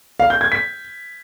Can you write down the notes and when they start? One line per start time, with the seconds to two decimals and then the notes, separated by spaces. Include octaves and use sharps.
0.20 F5
0.30 G6
0.41 G#6
0.52 B6